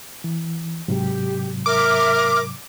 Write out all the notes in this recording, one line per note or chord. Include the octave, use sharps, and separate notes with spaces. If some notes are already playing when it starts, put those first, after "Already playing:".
E3
G#2 C3 F#3 G4
A#4 E5 D6 F6